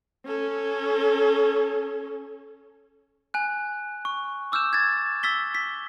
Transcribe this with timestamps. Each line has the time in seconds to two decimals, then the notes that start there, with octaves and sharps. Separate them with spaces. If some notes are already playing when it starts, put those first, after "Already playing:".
0.26 C#4 A4
3.34 G#5 F#6
4.05 C#6
4.52 D6 E6 F6 G6 E7
4.73 G#6 A6
5.23 E6 A6 B6 G7
5.55 B6